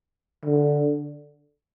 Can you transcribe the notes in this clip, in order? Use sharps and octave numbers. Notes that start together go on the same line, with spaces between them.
D3